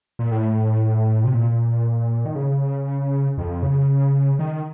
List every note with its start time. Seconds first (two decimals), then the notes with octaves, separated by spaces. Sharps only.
0.19 A#2
0.31 A2
1.24 C3
1.34 A#2
2.25 D#3
2.35 C#3
3.38 F2
3.63 C#3
4.39 D#3